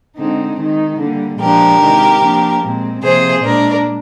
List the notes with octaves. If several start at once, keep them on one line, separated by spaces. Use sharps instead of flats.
D3 G#3 C4 D#4
D#3 G#3 D#4
D3 G3 A#3
A#2 F3 G#3 D4 G4 A#4
C3 D#3 G#3
F3 A#3 D4
A#2 G#3 C4
C3 F3 A#3 G#4 C5
A#2 G#3 D4 A#4 D5